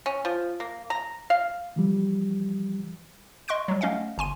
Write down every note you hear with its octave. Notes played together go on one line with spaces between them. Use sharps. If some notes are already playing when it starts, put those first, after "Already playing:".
C#4
F3
A#3
A#5
F5
E3 F3 G3
D#5 C6 C#6 F#6 D7
F#3 G3
A3 C#4 D#5 F5 F#5
G1 G#5 C6 D#7